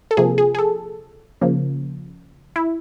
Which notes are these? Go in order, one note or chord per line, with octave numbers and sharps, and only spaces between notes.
A4
C3 F3 A#3 G#4
G#4
G#4
A4
C#3 F3 A#3
E4